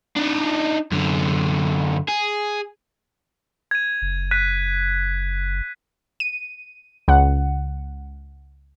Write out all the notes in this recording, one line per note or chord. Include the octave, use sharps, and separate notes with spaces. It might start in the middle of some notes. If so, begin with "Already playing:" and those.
D4 D#4
F#2 D3
G#4
G#6 D#7
F#1
F#6 B6 D#7
D#7
C#2 F#5